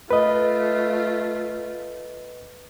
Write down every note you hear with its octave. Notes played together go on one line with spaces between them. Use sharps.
A3 F4 B4 D#5